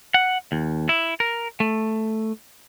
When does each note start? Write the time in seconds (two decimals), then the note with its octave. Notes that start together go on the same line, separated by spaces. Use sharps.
0.14 F#5
0.52 D#2
0.89 E4
1.20 A#4
1.60 A3